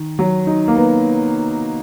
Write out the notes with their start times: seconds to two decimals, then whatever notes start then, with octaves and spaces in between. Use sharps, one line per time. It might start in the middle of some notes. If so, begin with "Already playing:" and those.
Already playing: D#3
0.19 F#3
0.47 D#4
0.68 A#3
0.76 B3